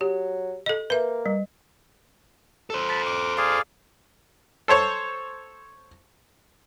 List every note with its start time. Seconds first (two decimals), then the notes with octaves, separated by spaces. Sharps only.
0.01 F#3 G4
0.66 A4 D#5
0.90 A#3 B4 E5
1.26 G3
2.70 A4 C5
2.89 A5 B5
3.06 D6
3.38 G#4 D5 F5
4.68 A4 C5 C#5 C#6